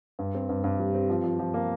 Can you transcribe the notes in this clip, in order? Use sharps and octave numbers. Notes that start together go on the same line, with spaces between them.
G2
C4
G2
G2
G3
C4
F3
F3
F3
A#3